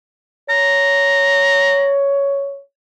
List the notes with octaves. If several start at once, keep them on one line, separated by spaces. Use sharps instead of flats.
C#5 A#5